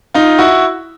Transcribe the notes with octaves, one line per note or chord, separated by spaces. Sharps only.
D#4 F4
E4 F#4